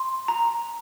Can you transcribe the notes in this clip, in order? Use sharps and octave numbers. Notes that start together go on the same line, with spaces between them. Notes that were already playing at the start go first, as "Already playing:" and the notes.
Already playing: C6
A#5